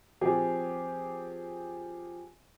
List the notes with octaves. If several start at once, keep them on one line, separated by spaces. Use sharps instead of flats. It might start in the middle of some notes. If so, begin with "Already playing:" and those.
F3 C4 G4 G#4